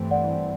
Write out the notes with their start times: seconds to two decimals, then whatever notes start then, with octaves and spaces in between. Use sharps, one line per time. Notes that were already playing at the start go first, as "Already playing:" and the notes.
Already playing: G2 E3 A3 C4
0.11 D5 F#5